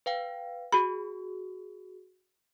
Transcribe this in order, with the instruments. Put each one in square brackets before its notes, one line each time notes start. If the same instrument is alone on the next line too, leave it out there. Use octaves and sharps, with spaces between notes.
[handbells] B4 F5 G5
[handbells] F#4 G#4 [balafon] B5